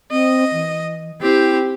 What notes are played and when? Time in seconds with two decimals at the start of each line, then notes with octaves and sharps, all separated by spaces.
0.11 C4 D#5
0.53 E3
1.21 C4 E4 G4